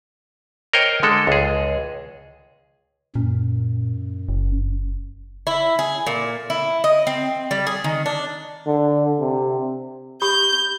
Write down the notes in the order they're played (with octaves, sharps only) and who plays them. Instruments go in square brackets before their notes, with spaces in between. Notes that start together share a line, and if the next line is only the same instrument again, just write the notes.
[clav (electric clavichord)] A#4 C5 C#5 D#5 G5
D3 G#3 A4
C#2 G#4
[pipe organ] F#2 [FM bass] A#2
[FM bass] F#1
[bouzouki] E4
G#4
A#2
E4
D#5
C4
G3
G#4
D#3
D4
[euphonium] D3
C3
[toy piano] G4 B5 D#6 [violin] G6